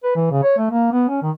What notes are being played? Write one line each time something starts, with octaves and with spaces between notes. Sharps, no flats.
B4
E3
C#3
C#5
A3
A#3
B3
C#4
D#3